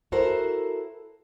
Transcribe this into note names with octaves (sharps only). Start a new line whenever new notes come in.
E4 F#4 A4 A#4 C5